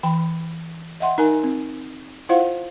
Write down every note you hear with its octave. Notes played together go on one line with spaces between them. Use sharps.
E3 G5 B5
D#5 E5 F#5 C6
D#4 A#4 G#5
C4
E4 F4 C5 F5 F#5